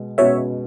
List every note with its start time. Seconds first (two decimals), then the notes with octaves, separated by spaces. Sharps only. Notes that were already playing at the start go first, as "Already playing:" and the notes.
Already playing: B2 G#3
0.18 B2 G#3 C#4 F#4 C#5 E5